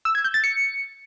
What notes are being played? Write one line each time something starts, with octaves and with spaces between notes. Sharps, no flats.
E6
G#6
G6
A6
C#7